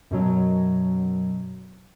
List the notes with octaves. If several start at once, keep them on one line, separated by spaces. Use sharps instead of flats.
F#2 B2 F#3